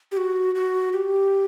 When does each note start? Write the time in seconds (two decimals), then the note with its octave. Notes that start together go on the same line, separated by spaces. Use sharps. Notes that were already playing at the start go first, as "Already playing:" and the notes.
0.12 G4
0.17 F#4
0.55 F#4
0.93 G4